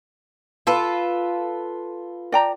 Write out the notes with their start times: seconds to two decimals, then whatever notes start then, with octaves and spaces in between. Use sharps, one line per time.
0.67 F4 A4 B4
2.32 D5 G5 A#5